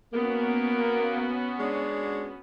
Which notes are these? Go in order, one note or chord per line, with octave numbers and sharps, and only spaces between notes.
A#3 B3 C#4 F#4
G#3 D4 C#5